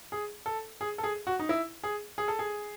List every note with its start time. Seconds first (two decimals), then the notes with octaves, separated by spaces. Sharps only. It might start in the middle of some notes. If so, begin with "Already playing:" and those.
0.12 G#4
0.46 A4
0.81 G#4
0.98 A4
1.04 G#4
1.27 F#4
1.39 D#4
1.49 E4
1.83 G#4
2.18 G#4
2.28 A4
2.39 G#4